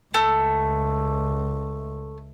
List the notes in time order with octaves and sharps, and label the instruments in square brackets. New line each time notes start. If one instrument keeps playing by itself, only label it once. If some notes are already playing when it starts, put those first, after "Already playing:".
[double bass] C#2 [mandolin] A3